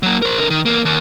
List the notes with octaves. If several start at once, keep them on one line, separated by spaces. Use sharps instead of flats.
F#3 A#3
A#4 C5
D3 A#4
D#3
E2 A#3
D#2